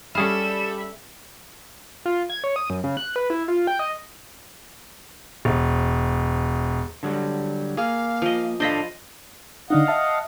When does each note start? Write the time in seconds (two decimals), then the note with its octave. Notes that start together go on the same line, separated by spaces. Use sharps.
0.15 G3 C#4 G#4 A4 E5 F5 B5 E7
2.06 F4
2.30 G#6
2.44 C#5
2.56 D#6
2.70 F#2
2.84 C#3
2.97 F#6
3.16 B4
3.30 E4
3.48 F4
3.67 G5
3.79 D#5
5.45 E1
7.03 D3 F#3 G3
7.77 A#3 G#4 F5
8.22 F3 D#5
8.60 D4 A4 C5 D#5 F5 B5
9.70 D3 D4 D#4 D#5 F5 F#5
9.87 E5 A5 F6